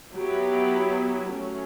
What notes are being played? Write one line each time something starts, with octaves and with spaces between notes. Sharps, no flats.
F#3 B3 E4 G4
F#3 A3 C#4